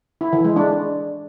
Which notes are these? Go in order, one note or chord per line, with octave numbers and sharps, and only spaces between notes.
E4
E3
G#3
D4